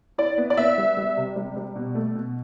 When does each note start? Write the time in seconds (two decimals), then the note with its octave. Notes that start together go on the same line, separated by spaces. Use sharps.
0.18 E4 D5
0.38 B3
0.50 D5
0.57 B3 E5
0.78 G3
0.97 G3
1.17 C3
1.36 G3
1.57 G3
1.76 B2
1.95 A3
2.15 B2